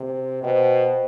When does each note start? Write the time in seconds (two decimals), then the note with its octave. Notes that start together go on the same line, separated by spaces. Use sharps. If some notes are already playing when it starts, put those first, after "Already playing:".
Already playing: C3
0.43 B2 C5 D#5 G5